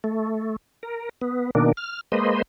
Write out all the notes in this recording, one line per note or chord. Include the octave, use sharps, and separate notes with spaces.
A3
A#4
B3
B2 D#3 A#3 D4
F6
G#3 A#3 B4 C5 D#5